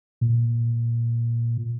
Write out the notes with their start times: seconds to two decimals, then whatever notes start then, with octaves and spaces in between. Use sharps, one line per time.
0.21 A#2